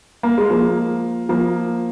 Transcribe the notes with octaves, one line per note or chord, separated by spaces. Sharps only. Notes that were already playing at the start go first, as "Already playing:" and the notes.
A#3
G#3
F3 A#3
F3 A#3